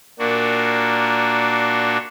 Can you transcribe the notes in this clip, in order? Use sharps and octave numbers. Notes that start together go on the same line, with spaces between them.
A#2 A#3 D4 F#4